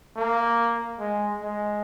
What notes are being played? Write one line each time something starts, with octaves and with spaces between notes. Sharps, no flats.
A#3
G#3
G#3